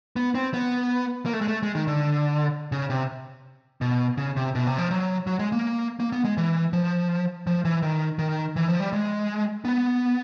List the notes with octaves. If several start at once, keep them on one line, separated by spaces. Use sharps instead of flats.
B3
C4
B3
A#3
A3
G#3
A3
G#3
D#3
D3
C#3
C3
B2
C#3
C3
B2
C3
F3
F#3
F#3
G#3
A#3
A#3
B3
G#3
E3
F3
F3
E3
D#3
D#3
E3
F3
G3
G#3
B3